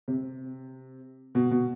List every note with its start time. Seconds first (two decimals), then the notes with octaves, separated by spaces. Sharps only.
0.08 C3
1.35 B2
1.51 B2